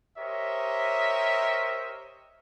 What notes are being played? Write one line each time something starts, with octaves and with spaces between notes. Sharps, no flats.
G4 A#4 C5 C#5 D#5 E5